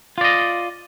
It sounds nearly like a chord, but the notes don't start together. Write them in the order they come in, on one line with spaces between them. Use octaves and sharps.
F4 D5 D#5